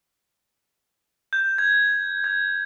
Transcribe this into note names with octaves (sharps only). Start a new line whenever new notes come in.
G6
G#6
G#6